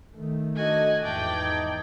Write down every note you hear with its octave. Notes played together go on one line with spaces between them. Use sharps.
D#3 A3
D4 F#4 A4 D#5 G#5
E2 G#2 D5 E5 G5 A5
D#4 A5 G#6